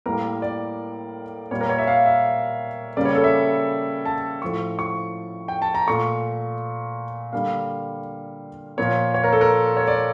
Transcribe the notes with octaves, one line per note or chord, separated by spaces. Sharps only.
A2 G3 A#3 A#4
D5
A#2 G3 A#3 C#5
A#4
C#5
E5
F5
E5
C#3 G3 A#3 D5
C#5
A4
E5
A5
A2 F3 A3 C#6
C#6
G5
A5
A#5
A#2 A3 C#6
D3 G3 A#3 F5
A#2 F3 A#3 C#5
C#5
A#4
A4
A#4
C#5
D5